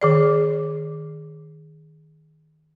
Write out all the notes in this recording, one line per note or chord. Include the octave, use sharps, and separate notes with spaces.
D#3 G#4 D5